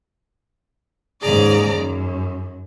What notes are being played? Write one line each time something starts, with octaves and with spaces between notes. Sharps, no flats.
D#2 G#2 C#3 G#4 D5 A#5
F#2